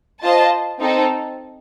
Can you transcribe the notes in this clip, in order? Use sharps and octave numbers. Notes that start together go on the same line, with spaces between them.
F4 C5 D#5 A5
C4 D#4 A4